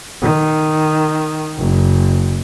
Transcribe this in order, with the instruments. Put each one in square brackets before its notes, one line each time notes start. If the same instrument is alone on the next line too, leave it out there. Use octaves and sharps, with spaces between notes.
[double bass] D#3
F#1